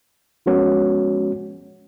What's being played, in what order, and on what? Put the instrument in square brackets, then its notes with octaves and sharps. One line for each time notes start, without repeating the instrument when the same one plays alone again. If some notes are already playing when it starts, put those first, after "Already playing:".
[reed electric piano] F3 G#3 B3 C#4 F#4 C#5